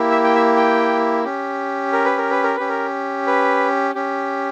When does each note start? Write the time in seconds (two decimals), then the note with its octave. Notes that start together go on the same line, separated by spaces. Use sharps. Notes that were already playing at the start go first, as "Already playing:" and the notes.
Already playing: A#3 E4 G4
0.11 E5
0.24 G5
0.35 E5
0.57 G5
1.25 C#4 G4
1.93 A#4
2.05 B4
2.18 A#4
2.31 B4
2.43 A#4
2.56 C#4 G4 B4
2.69 A#4
3.27 B4
3.95 C#4 G4